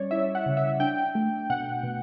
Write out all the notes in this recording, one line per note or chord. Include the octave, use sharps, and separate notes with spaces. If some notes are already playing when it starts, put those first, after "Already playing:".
Already playing: G3 C#4 C#5 D5
E4 E5
F#5
C#3
E5
D4 G5
A3
B2 F#5
B2